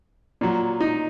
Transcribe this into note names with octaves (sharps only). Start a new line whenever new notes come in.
A#2 F#3
D#4